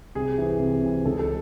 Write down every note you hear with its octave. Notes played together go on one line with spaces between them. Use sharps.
C2 G#4
C3 E3
C2
C3 E3
C#2 A4
A4